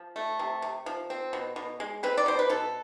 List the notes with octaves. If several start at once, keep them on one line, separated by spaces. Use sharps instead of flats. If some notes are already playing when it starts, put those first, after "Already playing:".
Already playing: F3
A3
C3
C3
F3
C4
B2
B2
G#3
C4 B4
D5
B2 C5
B4
B2 A4